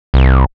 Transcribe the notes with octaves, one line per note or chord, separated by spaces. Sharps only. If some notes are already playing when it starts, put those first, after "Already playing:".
C2